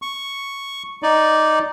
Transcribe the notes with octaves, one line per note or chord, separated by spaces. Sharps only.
C#6
D#4 D5